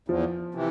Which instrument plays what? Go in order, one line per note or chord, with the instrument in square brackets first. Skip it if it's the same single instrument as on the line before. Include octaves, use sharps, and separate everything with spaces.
[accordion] E2 [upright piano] F3
[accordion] C3 E3